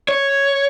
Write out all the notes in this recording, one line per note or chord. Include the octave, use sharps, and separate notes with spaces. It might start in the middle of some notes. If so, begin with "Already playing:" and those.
C#5